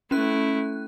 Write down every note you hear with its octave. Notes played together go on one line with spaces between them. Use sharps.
A3 C#4 E4 F#6